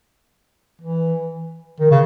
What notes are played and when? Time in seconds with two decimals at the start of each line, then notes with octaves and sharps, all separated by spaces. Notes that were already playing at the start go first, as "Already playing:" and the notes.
0.81 E3
1.80 D#3
1.91 C#3